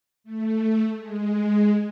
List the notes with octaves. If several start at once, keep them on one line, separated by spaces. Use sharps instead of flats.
A3
G#3